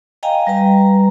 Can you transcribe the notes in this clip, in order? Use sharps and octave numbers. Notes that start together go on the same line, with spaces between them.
D#5 F5 G5 G#5 A#5
G3 B4 A#5